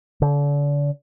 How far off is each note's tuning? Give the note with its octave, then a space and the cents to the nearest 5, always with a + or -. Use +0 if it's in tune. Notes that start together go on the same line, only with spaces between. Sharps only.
D3 -35